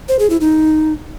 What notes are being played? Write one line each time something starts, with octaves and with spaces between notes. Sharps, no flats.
C5
G#4
E4
D#4